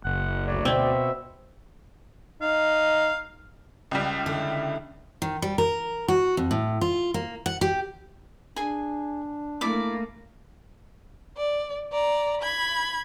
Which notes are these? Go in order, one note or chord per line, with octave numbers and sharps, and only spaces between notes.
F#1 F#5
D2 F#3 D5
B2 C4 E5
D#4 F5
C#2 G3
D3 E4
D#3
G3
A#4
F#4
F2
A2
F4
A#3
F#5
G4
D4 G#4 G#5
A3 A#3 E4 D5 D6
D5
D5 A#5
B5 G#6